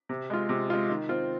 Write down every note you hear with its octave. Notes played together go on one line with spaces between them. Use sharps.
C3
G#3 F4
C3
G#3 F4
D#3
C4 F4